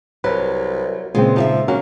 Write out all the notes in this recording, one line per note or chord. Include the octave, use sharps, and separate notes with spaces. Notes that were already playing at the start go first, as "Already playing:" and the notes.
C2 F#3 A#4 B4
A#2 C#3 G#3 B3 C4
F3 D#4 D5 E5
F#3 A#3 C#4 F#4